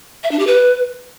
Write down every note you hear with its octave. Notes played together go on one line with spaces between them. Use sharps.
E5
D4
G4
B4